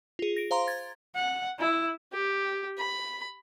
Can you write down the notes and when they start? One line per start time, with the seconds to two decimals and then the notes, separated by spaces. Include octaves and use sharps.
0.19 F4 G#4
0.36 A#6 D7
0.51 C5 F5 A#5 C6
0.68 G#6 A6
1.15 F#5
1.59 E4
2.13 G4
2.78 B5